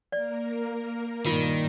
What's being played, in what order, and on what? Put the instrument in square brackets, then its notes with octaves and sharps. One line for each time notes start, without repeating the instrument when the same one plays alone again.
[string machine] A#3 A#4 [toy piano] D5
[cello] G2 A#2 [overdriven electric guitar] D#3 [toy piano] F4